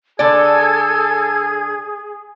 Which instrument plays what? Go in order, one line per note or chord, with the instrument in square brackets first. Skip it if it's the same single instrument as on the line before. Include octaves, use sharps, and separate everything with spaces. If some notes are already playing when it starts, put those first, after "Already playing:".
[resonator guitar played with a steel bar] D3 D5 [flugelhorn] G#4 [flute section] A4 G#5 [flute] G#6